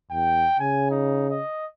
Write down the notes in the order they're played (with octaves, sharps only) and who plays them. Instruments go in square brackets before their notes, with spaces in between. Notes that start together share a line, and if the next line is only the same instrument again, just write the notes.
[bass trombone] E2 [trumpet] G5
[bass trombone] C#3 [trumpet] G#5
[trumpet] D#4
D#5